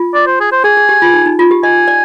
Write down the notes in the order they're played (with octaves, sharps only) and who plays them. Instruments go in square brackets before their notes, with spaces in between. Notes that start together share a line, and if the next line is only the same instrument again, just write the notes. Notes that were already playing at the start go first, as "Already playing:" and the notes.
Already playing: [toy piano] F4
[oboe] D5
C5
G#4
C5
[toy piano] G#4 [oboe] G#5
[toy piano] G#4
G4
F4
D#4
D#4
F4
G4
[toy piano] D#5 [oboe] G#5
[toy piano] D5